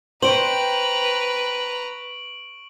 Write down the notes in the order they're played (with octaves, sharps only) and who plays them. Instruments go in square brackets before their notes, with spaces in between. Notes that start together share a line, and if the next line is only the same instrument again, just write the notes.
[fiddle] B4 A#5 [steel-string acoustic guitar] C5 G5 [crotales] C#6 D7 F#7